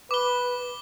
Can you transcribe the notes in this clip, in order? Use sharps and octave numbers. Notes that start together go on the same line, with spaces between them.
B4 D6 G7